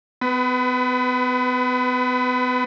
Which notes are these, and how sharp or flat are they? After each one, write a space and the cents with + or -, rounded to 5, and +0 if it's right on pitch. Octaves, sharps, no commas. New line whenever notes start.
B3 +35 B4 +10